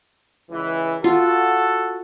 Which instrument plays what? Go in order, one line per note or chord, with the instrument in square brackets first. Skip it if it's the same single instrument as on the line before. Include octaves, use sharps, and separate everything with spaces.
[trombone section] C#2 E3
[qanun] F4 [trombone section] F#4 [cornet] A4